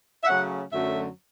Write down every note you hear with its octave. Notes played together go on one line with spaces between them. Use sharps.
E5
C#3 F#3 A3 C#4 F#5
F#2 D3 F#3 A3 E5